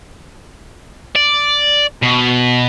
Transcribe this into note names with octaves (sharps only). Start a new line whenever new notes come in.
D5
B2